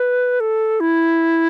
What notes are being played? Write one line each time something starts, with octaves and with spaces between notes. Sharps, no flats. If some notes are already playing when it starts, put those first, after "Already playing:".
Already playing: B4
A4
E4